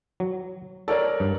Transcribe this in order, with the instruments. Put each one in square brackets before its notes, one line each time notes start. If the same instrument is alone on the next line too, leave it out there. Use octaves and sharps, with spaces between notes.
[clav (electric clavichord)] F#3
[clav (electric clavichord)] A4 [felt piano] A#4 C#5 D5
[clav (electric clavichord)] G2